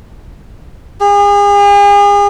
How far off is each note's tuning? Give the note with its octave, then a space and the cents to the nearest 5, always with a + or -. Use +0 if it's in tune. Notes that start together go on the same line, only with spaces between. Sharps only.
G#4 -40